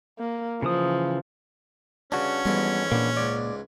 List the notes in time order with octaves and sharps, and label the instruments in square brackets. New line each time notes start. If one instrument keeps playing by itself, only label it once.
[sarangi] A#3
[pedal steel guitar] C#3 E3 D#6 [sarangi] F3
[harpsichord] G2 C#3 [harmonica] C#4 [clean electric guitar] D4 F#4
[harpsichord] F2 G#2 E3 [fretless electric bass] G3 B3
[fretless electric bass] A#2 [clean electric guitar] A#3 B3 D4
[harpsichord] C#2 G#2 [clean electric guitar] D5